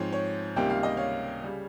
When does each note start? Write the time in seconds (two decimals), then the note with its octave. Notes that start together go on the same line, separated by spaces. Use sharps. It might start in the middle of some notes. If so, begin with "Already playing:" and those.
Already playing: G#2 F3 C4 C#5
0.13 C#5
0.56 C#2 C3 D#3 G3 A#3 G5
0.70 F5
0.83 D#5
0.97 C#5 F5
1.44 C#3 G3